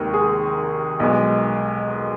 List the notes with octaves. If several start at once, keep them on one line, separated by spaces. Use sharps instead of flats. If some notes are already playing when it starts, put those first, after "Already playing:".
Already playing: F1 D#2 D#3 G#3
G#4
B1 B2 G#3